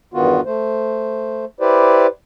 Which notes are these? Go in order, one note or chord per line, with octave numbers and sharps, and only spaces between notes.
E2 G2 D#3 B3 F4 F#4
A3 C5
E4 G4 B4 C5 D5